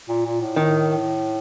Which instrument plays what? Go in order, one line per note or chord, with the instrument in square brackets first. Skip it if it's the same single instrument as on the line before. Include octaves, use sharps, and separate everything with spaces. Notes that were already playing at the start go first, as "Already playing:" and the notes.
[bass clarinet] A#2
A#2
A2
[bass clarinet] A2 [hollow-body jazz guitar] D#3